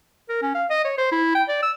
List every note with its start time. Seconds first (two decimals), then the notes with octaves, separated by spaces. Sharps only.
0.29 A#4
0.43 C#4
0.55 F5
0.70 D#5
0.85 C#5
0.98 C5
1.12 E4
1.35 G5
1.49 D5
1.63 E6